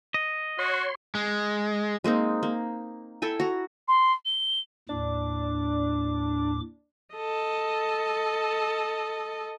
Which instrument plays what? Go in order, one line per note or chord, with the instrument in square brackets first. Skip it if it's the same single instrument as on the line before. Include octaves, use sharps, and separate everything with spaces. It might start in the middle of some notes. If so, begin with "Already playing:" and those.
[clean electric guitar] D#5
[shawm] F#4 [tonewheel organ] C#5 C6
[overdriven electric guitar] G#3
[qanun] G#3 A#3 C4 D#4
A#3
E4 A4 G5 G#5
F#4 A#5
[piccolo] C6
G7
[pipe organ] D#2 A2 D6 [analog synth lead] D4
[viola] A4 D#5